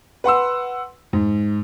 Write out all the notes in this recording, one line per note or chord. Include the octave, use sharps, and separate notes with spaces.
B4 F#5 C6 E6
G#2